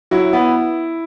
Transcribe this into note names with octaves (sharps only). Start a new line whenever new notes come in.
F#3 E4
B3